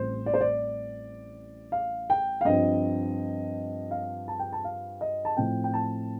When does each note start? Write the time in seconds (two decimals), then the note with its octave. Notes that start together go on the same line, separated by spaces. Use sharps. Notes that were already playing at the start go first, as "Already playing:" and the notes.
Already playing: A1 A2 G3 C4 C5
0.26 D5
0.34 C5
0.41 D5
1.72 F5
2.10 G5
2.41 F5
2.45 G2 F3 C4 D#5
3.91 F5
4.28 A5
4.39 G5
4.53 A5
4.64 F5
5.01 D#5
5.25 A5
5.37 A2 F3 C4 G5
5.64 G5
5.74 A5